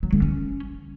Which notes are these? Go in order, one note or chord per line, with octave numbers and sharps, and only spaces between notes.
F#3
D3
C#4